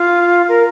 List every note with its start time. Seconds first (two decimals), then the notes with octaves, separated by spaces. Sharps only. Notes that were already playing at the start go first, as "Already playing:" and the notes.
Already playing: F4
0.49 A#4